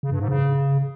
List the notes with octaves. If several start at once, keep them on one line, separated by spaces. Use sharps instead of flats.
C#3
G2
G#2
C#3